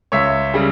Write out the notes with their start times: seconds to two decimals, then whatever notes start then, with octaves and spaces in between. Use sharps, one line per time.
0.12 C#2 C#5 E5
0.54 C#3 G3